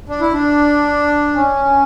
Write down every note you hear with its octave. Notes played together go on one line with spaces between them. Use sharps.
D4
E4
D4
C#4